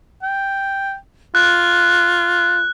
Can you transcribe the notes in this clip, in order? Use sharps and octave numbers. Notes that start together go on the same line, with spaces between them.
G5
F4 F#6